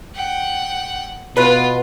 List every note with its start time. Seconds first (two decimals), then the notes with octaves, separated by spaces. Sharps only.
0.15 F#5 G5
1.37 B2 F4 B4 F#5